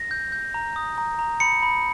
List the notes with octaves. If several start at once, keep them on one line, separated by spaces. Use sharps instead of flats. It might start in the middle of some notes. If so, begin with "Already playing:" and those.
Already playing: A#6
G6
G6
A#5
D#6
A#5
A#5
B5 C#7
B5